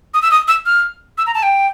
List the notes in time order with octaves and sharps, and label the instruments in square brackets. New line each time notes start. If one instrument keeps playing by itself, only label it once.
[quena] D#6
E6
D#6
E6
F6
E6
A#5
A5
G5